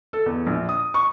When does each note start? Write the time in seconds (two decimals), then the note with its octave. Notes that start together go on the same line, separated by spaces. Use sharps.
0.13 A4
0.26 E2
0.47 A#1
0.69 D#6
0.94 C#6